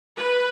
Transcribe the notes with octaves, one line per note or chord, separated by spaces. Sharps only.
B4